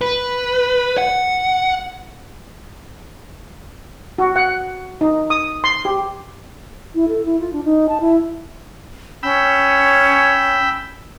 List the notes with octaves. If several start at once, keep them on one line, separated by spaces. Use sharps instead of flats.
B4
F#5
F#4
F#5
D#4
D#6
C6
G4
E4
A4
E4
F4
D4
D#4
A5
E4
C#4 G5 B5 E6